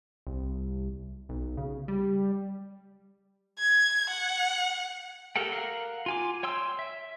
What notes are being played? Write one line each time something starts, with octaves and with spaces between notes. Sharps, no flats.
C2
B1
C#3
G3
G#6
F#5
G4 A4 A#4 F#5 G5
A#4 F5 F#5
F4 G#5 D6
C#5 G5 C6 E6
E5